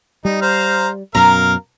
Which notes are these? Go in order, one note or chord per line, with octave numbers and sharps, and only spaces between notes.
G3 D#4
C5 F5 A#5
F#2 B2 A#4 F5 A#5